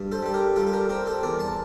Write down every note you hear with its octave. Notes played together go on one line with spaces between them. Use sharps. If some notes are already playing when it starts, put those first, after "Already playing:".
Already playing: G2
A4 C5
G3 A4
G4 A#4
G3 F4 A4
A4
G4 A#4
C4 G4 A#4
A4 C5
E2 A#4 D5
A5 C6